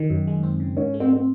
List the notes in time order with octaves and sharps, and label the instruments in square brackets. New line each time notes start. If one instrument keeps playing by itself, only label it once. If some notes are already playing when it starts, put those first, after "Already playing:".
Already playing: [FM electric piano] D#3 [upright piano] D#4
[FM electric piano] F#2
G#3
C4
C#3
[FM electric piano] G#2 [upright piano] C#4
[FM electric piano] A3
[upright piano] C4
C4